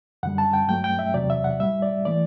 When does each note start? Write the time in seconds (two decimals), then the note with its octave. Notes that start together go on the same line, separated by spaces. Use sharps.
0.23 F#2 D3 G3 F#5
0.38 A5
0.53 G5
0.68 G2 F#3 A3 G5
0.84 G5
0.99 E5
1.14 E2 C3 F#3 D5
1.30 E5
1.44 F#5
1.60 A2 G3 E5
1.82 D5
2.05 E3 A3 D5